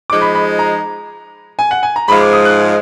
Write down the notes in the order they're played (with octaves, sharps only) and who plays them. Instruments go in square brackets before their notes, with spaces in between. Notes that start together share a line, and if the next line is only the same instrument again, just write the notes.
[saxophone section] F3 G#3 D#4 [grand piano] D6
[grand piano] B5
B5
A#5
G#5
F#5
G#5
A#5
[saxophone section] G#2 F3 G#3 [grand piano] B5
[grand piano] D6
D#6
F#6